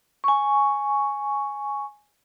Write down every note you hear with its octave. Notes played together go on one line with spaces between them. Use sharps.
G#5 C#6